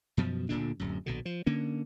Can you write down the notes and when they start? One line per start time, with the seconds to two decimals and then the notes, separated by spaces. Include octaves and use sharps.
0.17 F#2 B2 F3
0.49 D1 A#2 D3 D4
0.80 D1 F#2
1.06 A#1 B2 D3
1.25 F3
1.46 D3 A#3 C#4